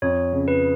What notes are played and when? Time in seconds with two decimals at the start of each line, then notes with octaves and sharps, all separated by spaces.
0.02 F2 C#5
0.33 C#3
0.48 B4